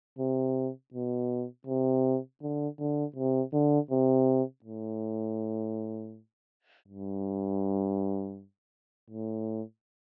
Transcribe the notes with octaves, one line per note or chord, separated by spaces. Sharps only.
C3
B2
C3
D3
D3
C3
D3
C3
A2
G2
A2